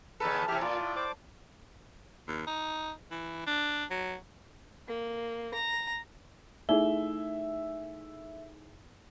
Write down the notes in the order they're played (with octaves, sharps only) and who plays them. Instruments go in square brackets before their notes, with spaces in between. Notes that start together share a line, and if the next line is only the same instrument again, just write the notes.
[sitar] D#2 C#3 A4 [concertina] B4
[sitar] C3 E3 [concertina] G4 E5 F6
[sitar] A#2 [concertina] F4 D5
[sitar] A2
[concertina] C5 D5 D6
[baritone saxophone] D#2
D#4
E3
D4
F#3
[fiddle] A#3
A#5
[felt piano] A3 E4 G#4 [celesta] D#4 G7 [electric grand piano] E5